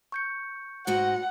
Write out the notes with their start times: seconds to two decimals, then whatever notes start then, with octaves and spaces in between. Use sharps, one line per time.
0.12 C#6 G6 C#7
0.87 G#2 F#4 D#5 F#5